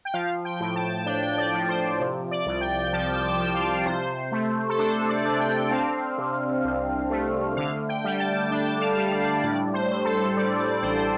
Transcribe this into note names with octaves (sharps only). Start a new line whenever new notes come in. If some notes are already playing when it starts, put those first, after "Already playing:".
G5
F3 F5
G5
A2
A5
D4 G5
D5
F3
C5
C3
D5
C2
G5
F3 A5
G5
A5
G5
F3
F5
C3 C5
A3
A4
D4 C5
D5
D4
G5
C4 F5
C3
C2
A3
D3 F5
G5
G3
A5
A5
D4 G5
F5
G3
D5
A2 D5
C5
A2
A4
G3 D5
D5
A1 C5